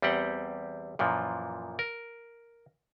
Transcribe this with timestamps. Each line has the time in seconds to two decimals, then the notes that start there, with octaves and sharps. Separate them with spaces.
0.02 E2 G3 C4 G4 F#5
0.99 F#2 A#2 E3 F3
1.79 A#4